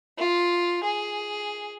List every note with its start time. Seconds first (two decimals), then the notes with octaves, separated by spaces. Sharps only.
0.18 F4
0.83 G#4